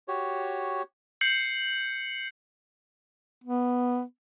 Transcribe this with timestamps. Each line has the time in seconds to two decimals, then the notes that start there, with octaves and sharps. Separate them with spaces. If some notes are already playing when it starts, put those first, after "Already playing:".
0.08 F#4 G4 C#5
1.21 G6 C7 C#7 F#7
3.44 B3